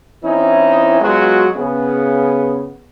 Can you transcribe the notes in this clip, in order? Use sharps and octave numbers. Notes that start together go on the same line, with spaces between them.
E3 C4 C#4 D#4 E4
F#3 G#3 B3 F4 F#4
C#3 B3